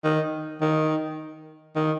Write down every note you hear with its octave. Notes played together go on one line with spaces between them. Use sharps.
D#3
D#3
D#3